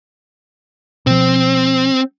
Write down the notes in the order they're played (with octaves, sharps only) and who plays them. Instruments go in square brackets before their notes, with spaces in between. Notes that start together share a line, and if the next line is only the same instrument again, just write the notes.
[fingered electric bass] B2 F3 [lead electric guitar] C4